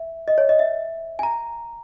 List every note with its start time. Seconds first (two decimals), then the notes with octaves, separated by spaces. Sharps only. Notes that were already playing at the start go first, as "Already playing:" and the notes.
Already playing: E5
0.28 D#5
0.38 C#5
0.49 D#5
0.59 E5
1.19 G#5
1.23 A#5